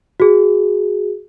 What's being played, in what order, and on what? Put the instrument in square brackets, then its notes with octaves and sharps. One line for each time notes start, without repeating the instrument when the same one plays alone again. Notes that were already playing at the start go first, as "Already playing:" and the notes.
[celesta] F#4 G#4